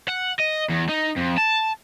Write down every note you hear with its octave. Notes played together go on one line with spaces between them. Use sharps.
F#5
D#5
E2
D#4
F2
A5